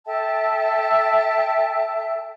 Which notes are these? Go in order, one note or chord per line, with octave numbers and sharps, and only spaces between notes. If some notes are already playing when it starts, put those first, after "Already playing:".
A4 E5 G5 A5